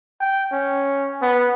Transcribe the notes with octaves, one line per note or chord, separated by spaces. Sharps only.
G5
C#4
B3